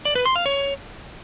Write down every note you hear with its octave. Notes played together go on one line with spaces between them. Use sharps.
D5
B4
C6
F5
C#5